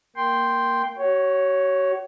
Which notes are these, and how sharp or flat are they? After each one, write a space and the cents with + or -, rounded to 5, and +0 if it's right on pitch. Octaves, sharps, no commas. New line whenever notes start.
A#3 +0 G5 +0 C6 +0
F#4 +40 C#5 +0